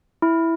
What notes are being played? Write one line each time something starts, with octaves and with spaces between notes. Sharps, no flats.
E4